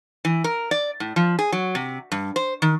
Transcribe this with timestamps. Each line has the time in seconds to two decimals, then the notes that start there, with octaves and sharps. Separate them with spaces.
0.25 E3
0.44 A#4
0.71 D5
1.00 A2
1.16 F3
1.39 G#4
1.52 F#3
1.75 C3
2.12 G2
2.36 C5
2.62 D#3